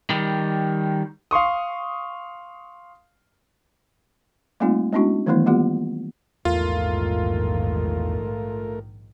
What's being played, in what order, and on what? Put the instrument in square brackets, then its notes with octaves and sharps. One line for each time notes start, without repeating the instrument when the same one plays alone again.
[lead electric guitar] D#3 G3
[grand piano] F5 C6 C#6 D#6
[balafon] G3 A3 A#3 C4 D#4 F4
G#3 B3 C#4 D4 E4 F#4
D#3 E3 F#3 A3 B3 E4
G3 A#3 B3 F4 G4
[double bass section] A#1 G#2 D#3 [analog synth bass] E2 [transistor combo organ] A3 A#4 [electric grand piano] F4